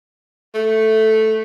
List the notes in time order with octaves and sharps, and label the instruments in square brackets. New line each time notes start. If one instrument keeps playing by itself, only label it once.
[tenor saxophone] A3